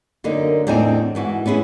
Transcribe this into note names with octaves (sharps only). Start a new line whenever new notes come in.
F#2 D3 A#3 D#4
E2 A2 C4 D4 D#4 G#5
G#2 E3 F#4
B3 C#4 E4 G#4